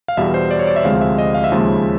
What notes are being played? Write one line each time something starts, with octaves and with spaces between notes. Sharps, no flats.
F5
E2 B2 G3 E5
C5
D5
C#5
D5
E5
D2 C3 F3 G#3 F5
E5
D#5
F5
E5
D#2 C#3 F3 G#3